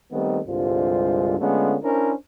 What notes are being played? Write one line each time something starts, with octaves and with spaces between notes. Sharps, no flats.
D#3 G3 A3 B3 C4 D#4
C2 G2 D3 G#3 F4 C5
D3 G#3 A3 B3 C#4 F4
C#4 D4 E4 A#4 C5